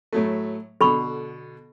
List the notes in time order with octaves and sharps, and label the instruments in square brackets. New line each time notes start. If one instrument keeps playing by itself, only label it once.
[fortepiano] A2 F#3 A3
[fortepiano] B2 D3 [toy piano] A4 B5 C#6